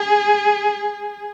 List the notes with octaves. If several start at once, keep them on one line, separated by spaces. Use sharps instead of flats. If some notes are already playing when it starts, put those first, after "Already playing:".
Already playing: G#4